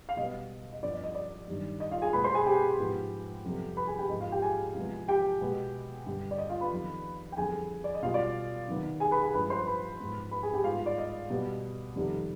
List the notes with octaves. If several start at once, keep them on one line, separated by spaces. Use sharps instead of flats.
F5
B2 G3 B3 D#5
D#5
G2 F3 B3 D5
D#5
D#5
D5
G2 D#3 G3
D#5
F4 F5
G#4 G#5
B2 G#3 B3 B4 B5
C5 C6
G#4 G#5
G4 G5
G#2 F3 B3
F2 C3 G3 B3
B4 B5
G#4 G#5
G4 G5
G#2 F3 B3 D#5
F4 F5
G4 G5
G#4 G#5
C3 F3 G#3 B3
G4 G5
B2 G#3 B3
G2 D3 G3
D5
D#5
F4 F5
B4 B5
F2 D#3 B3
G5
F2 D3 G3 B3 G#4 G#5
D5
D#5
B2 G3 B3 F4 F5
D5
C3 D#3 B3
G#4 G#5
B4 B5
G#4 G#5
G2 F3 G#3 B4 B5
C5 C6
B4 B5
G#2 F3 G#3 B3
B4 B5
G#4 G#5
G4 G5
G#2 G3 B3 F4 F5
D5
D#5
B2 G3 B3
F2 C3 D#3 G3 B3